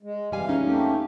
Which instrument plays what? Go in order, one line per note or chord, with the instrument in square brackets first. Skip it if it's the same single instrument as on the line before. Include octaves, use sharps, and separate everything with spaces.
[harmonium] G#3
[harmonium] F2 E3 F5 [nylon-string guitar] G3 G#5
[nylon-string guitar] C#4 D#4
[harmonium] A3 A#3 G4